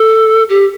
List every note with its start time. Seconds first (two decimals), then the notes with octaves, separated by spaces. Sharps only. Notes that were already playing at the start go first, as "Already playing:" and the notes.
Already playing: A4
0.49 G4